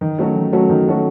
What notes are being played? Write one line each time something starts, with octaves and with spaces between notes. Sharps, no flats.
D#3
F#3 A3 C#4 F#4
D#3
F#3 A3 C#4 F#4
D#3
F#3 A3 C#4 F#4